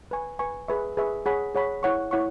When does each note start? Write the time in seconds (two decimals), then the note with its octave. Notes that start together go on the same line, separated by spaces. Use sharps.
0.11 B4 G#5 C#6
0.39 B4 G#5 C#6
0.68 G#4 B4 E5 C#6
0.97 G#4 B4 E5 C#6
1.26 G#4 C#5 F#5 B5
1.55 G#4 C#5 F#5 B5
1.83 E4 C#5 F#5 C#6
2.11 E4 C#5 F#5 C#6